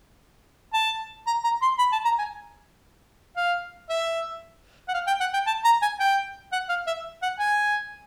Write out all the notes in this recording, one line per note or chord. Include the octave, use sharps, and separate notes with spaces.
A5
A#5
A#5
C6
B5
A5
A#5
G#5
F5
E5
F#5
F5
G5
F#5
G5
A5
A#5
G#5
G5
F#5
F5
E5
F#5
G#5